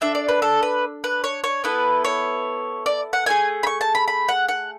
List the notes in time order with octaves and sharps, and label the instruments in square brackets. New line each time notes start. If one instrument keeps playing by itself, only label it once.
[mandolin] D4 A4 E5
D5
B4
A4
B4
B4
C#5
C#5
B3 E4 A4 B4
C#5
D5
F#5
A3 D4 G#4 G#5
B5
C#6
A5
B5
B5
F#5
F#5